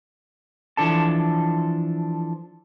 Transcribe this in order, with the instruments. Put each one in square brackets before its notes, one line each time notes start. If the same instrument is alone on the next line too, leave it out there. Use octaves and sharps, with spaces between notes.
[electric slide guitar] E3 F3 D4 A4 A5